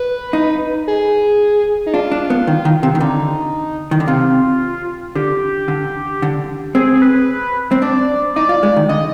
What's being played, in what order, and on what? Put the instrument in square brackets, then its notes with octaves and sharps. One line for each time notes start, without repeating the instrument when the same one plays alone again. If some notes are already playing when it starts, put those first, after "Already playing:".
Already playing: [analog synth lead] B4
[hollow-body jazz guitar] D#4
[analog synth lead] G#4
D#4
[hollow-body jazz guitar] D4 [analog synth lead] F4
[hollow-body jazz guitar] D4
B3
D#3
D#3
C3
D#3
[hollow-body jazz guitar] D3 [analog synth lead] D#4
[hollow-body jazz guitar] D#3
D3
[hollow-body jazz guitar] C3 [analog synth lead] F4
[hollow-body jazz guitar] D3 [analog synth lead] G4
[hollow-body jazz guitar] D3
D3
[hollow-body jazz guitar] C4 [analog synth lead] G#4
[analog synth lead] G#4
B4
[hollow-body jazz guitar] C4
[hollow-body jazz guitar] D4 [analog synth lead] D5
[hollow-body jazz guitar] D#4 [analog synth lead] D5
[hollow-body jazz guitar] F4
G#3
D#3
[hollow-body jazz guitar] D3 [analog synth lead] D#5